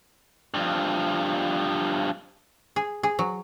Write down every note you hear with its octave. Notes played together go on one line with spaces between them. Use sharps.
G2 F3
G#4
G#4
F#3